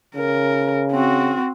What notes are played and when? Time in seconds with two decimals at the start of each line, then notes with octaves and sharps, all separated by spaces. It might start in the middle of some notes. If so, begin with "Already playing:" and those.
0.16 C#3 A#4
0.91 C4 F#4